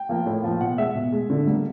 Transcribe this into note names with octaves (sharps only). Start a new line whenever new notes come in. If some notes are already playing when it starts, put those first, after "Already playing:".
Already playing: G5
F3 A#3
A2
F3 A#3
B2 F#5
G#3 E5
B2
G#3
D3
G3 A#3